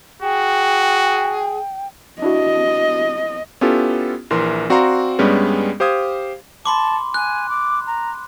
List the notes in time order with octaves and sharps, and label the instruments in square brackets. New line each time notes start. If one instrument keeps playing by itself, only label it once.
[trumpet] F#4 [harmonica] G#4 [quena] G5
[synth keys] D4 E4 F#4 [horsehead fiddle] D#5
[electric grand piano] B3 C#4 E4 F4 G4 A4
A#1 E3 A#4 C6
C4 F#4 D5 F5 A#5 C6
G2 G3 G#3 B3 C#4
G4 C5 F5 D#6 G#6
[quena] A5 [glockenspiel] B5 C6 D6
[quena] G#5 [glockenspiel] F#6
[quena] D6
A#5